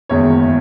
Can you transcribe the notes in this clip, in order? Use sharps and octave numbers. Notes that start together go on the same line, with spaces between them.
F#1 E2 D#3 G#3 C#5